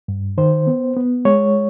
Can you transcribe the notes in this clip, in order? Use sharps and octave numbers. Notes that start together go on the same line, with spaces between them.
G2
D#3 C5
B3
B3
G#3 C#5